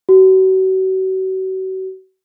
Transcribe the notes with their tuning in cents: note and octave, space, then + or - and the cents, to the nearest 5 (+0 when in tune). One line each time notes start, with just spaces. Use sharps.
F#4 +35